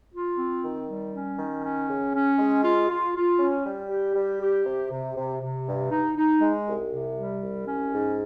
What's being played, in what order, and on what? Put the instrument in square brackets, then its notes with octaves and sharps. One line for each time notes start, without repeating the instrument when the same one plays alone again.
[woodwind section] F4
C4
D#3
G3
C#4
D#3
C#4
C#3
C#4
G#3
F4
F4
F4
C#4
G3
G4
G3
G4
C3
C3
C3
C3
G2
D#4
D#4
G#3
C2
C3
G3
C2
C#4
G#2